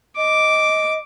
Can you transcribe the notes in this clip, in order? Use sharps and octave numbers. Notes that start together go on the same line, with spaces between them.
D#5 D6